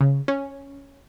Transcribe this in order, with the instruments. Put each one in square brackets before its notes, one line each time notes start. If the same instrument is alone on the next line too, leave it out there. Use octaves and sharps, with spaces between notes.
[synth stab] C#3
C#4